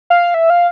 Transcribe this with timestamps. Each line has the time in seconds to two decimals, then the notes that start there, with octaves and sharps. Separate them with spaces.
0.10 F5
0.34 E5
0.50 F5